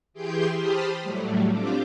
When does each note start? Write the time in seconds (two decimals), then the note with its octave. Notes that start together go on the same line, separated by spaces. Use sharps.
0.14 E3 G4 G#4 G5 C6 G6
0.54 G4 C5 A5 B5 D#6 F6
1.02 A2 F#3 G3 A3
1.51 C4 D4 F4 G4 D6